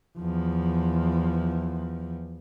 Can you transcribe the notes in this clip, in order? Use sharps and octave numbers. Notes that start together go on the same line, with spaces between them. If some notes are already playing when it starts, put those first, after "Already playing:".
E2 F3